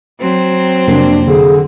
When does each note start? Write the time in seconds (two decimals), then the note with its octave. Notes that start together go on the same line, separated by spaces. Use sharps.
0.20 F#3 C4 C5
0.87 F2 C3 A#3 D4
1.27 D3 G#4